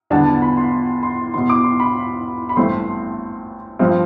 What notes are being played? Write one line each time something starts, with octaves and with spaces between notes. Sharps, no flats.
E2 D3 G3 B3 D4 A5
A5
B5
C6
C6
E1 E2 B2 C6
D6
C6
B5
B5
A1 G2 E3 A3 C4 C6
G2 F3 C4